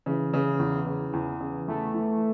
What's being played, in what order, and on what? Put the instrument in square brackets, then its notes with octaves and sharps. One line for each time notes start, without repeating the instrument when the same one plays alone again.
[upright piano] C#3 [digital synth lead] E3
[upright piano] C#3
E2
C#3
E2
C#3
[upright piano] E2 [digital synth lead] A3
[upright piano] E3